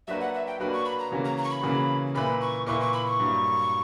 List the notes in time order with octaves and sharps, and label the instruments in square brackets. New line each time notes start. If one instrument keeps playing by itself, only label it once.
[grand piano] F#3 A#3 D4 F#4 B4 [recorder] E5
[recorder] F#5
E5
G5
[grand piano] F#3 A#3 D4 F#4 B4 [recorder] B5
[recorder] C#6
B5
A#5
[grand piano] C#3 E3 A#3 C#4 F#4
[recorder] A#5
A#5
C#6
B5
[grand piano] C#3 E3 A#3 C#4 F#4
[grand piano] A#2 A#3 E4 B4 [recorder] B5
[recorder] C#6
[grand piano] A#2 A#3 E4 B4 [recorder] C#6
[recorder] C#6
B5
C#6
[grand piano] G2 F#3 A#3